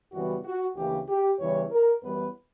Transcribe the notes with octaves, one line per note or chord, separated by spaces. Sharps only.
F#2 C#3 E3 G3 B3 F#4
F#4
D2 C#3 E3 A#3 C#4 G4
G4
E2 C#3 E3 G3 C#5
A#4
F#2 E3 G3 B3 B4